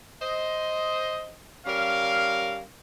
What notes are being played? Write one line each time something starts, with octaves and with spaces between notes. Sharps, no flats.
C5 D#5
G3 C#4 A#4 F5